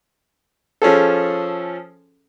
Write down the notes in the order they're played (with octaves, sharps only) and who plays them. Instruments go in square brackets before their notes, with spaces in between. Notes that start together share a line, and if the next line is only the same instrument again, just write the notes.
[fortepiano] F3 C#4 G#4 A4